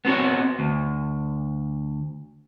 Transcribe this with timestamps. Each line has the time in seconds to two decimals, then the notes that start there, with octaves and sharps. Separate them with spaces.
0.05 B3 C4 F#4 C#5
0.59 D2